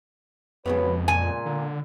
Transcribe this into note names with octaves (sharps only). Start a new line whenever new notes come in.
F2 C#3 G#3 B3 F#4 B4 C#5
A#2 G#5
D3